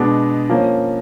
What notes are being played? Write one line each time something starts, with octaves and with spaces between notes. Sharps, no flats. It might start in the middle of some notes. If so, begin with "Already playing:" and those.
Already playing: B2 G#3 B3 D4
F3 A#3 C#4